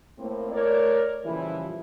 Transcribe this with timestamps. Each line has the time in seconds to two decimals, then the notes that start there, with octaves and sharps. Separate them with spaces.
0.18 A2 A#3 C4
0.52 A3 A#4 C#5 D5
1.25 A#2 C#3 E3 F3 G3 E4